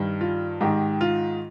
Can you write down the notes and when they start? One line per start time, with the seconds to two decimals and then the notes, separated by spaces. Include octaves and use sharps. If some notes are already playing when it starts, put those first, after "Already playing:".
Already playing: G2 D#3
0.21 F4
0.61 G#2 D#3 G4
1.01 F4